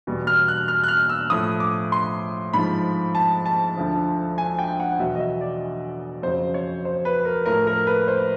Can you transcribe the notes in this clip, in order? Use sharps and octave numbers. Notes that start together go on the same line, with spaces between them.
E2 B2 G3
F6
F#6
F6
F#6
F6
E6
A2 F3 D#6
D6
C6
G#2 F3 B5
A5
A5
D2 D3 F3
G#5
G5
F#5
E2 B2 F#3 E5
D#5
E5
D5
F2 C#3 F#3 C5
C#5
C5
B4
A#4
A2 F3 A#4
A#4
B4
C5